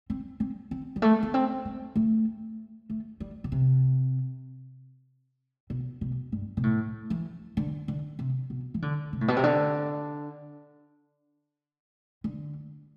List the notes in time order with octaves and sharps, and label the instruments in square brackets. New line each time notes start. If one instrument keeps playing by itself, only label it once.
[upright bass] C4
C4
C4
G3
A3
B3
C4
A3
A3
A3
G3
B2
C3
B2
B2
G2
B2
A2
E3
D3
D3
C3
B2
E3
D3
C3
A2
B2
C3
D3
D3